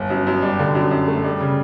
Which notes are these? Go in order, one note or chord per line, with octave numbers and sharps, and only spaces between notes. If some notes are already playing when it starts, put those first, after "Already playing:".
Already playing: G1
F#2
F#2
G3
D3
F#2
F#2
A3
G3
C#3